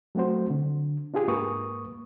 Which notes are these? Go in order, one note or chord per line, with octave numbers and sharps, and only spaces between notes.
F#3 A3 C4 F#4 C5
D3
D4 F4 G4 G#4
G#2 A#3 B4 C#6 D#6